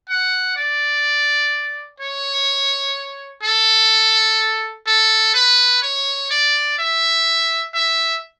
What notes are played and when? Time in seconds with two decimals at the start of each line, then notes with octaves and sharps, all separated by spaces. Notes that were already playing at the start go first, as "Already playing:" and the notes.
0.09 F#5
0.57 D5
2.00 C#5
3.43 A4
4.87 A4
5.35 B4
5.82 C#5
6.30 D5
6.78 E5
7.74 E5